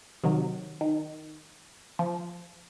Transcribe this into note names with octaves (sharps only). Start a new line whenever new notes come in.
C3 D#3 F#3
D#3
F3